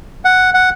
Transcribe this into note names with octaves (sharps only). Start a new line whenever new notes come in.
F#5
F#5